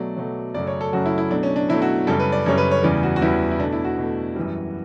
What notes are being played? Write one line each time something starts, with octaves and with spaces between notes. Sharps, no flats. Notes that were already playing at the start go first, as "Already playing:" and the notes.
Already playing: B2 F#3 A3 D5
B2 F#3 A3
F#2 C#3 F#3 A3 D5
C#5
A4
F#2 C#3 F#3 A3 F#4
E4
E4
B2 F#3 A3 D4
C#4
D4
B2 F#3 A3 E4
F#4
F#2 C#3 G3 A4
B4
D5
F#2 C#3 G3 C#5
B4
C#5
E2 C#3 E3 G3 D5
F#4
F#4
E2 C#3 E3 G3 E4
E4
B2 A3 D4
E4
F#4
B2 A3
F#2 E3 G3